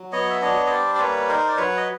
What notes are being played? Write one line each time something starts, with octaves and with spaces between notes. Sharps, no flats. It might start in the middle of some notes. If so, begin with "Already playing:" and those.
Already playing: F#3
B3 C#5 D#5
E5
D4 C#5 D#5
D#5
G3 C5 D5
D5
A#3 B4 C#5
D#4 A#4 C5
D5
F#3 B4 C#5
D#5